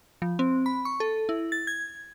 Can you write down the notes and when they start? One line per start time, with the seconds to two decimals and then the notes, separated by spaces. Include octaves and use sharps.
0.22 F3
0.39 C4
0.66 B5
0.85 C#6
1.00 A4
1.29 E4
1.52 A6
1.67 G#6